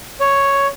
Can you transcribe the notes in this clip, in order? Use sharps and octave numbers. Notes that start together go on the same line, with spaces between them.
C#5